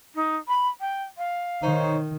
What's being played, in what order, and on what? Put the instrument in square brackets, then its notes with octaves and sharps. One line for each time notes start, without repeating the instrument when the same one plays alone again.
[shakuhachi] D#4
B5
G5
F5
[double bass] D#3 [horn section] D#4 C5 C#5